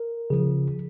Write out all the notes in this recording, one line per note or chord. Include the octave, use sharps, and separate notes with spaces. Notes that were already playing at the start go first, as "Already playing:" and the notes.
Already playing: A#4
C#3 F3 G#4